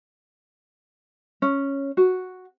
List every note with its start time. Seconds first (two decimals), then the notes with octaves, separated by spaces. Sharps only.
1.42 C#4
1.97 F#4